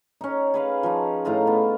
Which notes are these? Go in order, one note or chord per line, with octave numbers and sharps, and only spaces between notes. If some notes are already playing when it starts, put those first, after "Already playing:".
C#4 D#4
G#4 B4 F5
F3 D#4
A2 D#4 F4 A#5
B3